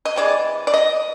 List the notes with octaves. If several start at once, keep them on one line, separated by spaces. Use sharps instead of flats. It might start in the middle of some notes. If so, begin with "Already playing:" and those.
D#5
C3 E3 G#3 D5
D5
D#5